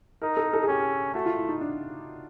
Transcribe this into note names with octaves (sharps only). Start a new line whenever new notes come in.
D#4 A#4
A4
A4
G#4
C#4 G4
A3 F#4
F4
E4
D#4
D4